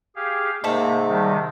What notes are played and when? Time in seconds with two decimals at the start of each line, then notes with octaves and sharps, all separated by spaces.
0.16 G4 G#4 F5
0.64 G#2 C3 A3 A#3 A4
1.07 C3 D#3 G3